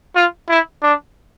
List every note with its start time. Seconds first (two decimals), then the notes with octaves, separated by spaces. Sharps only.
0.15 F4
0.49 E4
0.83 D4